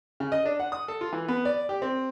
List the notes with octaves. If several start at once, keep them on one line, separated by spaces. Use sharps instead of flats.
C#3
D#5
D4
F#5
D#6
A4
F4
E3
B3
D5
G4
C4